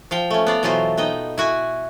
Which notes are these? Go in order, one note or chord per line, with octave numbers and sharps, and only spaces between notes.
F3 F5 G5
A3 C#4
B3 D5 F5
B2 E3 F#3 A3 F4 C5
B3 D#4 D#5 G5
E4 F#4 G#5